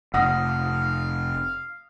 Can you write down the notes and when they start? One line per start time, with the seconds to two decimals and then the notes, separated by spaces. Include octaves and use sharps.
0.14 F1 F5 F#5 D#6 A#6